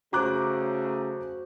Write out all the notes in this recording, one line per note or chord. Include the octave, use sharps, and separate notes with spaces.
C#3 F#3 A3 F#4 C5 A#5 D6 F#6